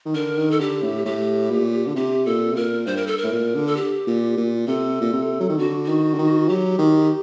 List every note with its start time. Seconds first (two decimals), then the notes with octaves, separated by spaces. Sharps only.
0.06 D#3
0.15 D3 A#4
0.38 D#3
0.51 A4
0.60 D3 G4
0.82 A2
1.05 A2 G4
1.51 A#2
1.87 D3
1.96 C3 G4
2.26 A#2 A4
2.52 C3
2.56 A#2 A#4
2.86 G2 C5
2.97 A#4
3.07 A4
3.18 A#4
3.23 A2
3.32 A#2
3.54 D3
3.67 A4
3.77 G4
4.07 A#2
4.37 A#2
4.67 C3 A4
5.01 A#2
5.13 C3
5.40 F#3
5.49 D#3
5.58 D3 F#4
5.85 D#3 F#4
6.14 D3
6.18 D#3
6.49 F#3 G4
6.78 D#3